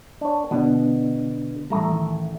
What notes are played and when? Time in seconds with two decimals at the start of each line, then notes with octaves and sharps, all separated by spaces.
0.21 D4 C#5
0.51 B2 D3 B3 D4
1.70 A1 G3 A3 A#5
1.92 D#3